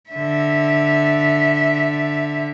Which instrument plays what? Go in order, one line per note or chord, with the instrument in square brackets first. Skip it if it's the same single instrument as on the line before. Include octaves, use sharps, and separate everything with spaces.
[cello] D3 E5